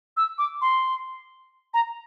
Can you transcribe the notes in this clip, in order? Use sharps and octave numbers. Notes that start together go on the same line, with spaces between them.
E6
D6
C6
A#5